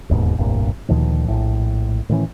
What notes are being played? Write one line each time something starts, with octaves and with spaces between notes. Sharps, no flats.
E1 D#2 G#2 B2
F1 C2 G2 A#2
D2 A#2 D#3 F3
A#1 A2
A2 D#3 E3 C#4